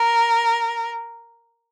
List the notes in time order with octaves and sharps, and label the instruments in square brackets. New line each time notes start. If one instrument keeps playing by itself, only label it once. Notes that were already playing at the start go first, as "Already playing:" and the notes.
Already playing: [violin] A#4